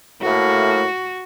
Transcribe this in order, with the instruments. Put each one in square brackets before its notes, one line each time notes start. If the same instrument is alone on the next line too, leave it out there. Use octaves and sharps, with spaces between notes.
[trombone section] A2 A3 A#3 [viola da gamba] F#4